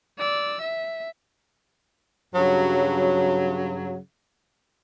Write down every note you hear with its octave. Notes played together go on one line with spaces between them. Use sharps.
D5 E6
E5
G2 C#3 F#3